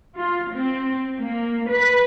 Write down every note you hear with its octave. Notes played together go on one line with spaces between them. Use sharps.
F4
C4
A#3
B4